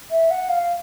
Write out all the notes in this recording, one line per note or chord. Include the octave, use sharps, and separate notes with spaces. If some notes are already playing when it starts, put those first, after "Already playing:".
E5
F#5
F5